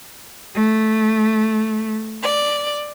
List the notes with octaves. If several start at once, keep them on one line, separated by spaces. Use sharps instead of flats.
A3
D5